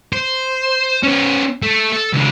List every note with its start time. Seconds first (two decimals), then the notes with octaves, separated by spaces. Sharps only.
0.13 C5
1.03 B3 C#4
1.62 A3
1.92 A4
2.13 C#2 D4